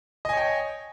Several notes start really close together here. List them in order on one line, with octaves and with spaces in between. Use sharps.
D#5 G#5 C#5 G5